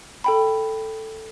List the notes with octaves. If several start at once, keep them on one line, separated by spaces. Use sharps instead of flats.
A4 G5 B5